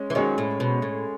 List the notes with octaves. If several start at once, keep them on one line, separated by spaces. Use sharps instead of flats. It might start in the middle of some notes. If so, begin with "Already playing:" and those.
Already playing: G#3 C#4
E3
D#3 F#3 G#3 C#4 G#4 C#5
A2
B2
A2